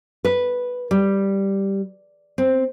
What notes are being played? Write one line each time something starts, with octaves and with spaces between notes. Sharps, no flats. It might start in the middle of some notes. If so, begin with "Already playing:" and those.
B4
G3
C4